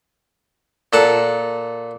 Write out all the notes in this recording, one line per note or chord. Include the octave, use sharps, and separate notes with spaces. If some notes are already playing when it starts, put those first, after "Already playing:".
A#2 A4 F#5 A5